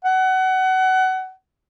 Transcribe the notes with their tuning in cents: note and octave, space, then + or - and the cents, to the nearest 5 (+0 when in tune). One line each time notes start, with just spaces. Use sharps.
F#5 +25